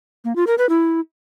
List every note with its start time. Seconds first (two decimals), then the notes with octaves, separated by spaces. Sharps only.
0.25 A#3
0.36 F4
0.47 A#4
0.58 B4
0.69 E4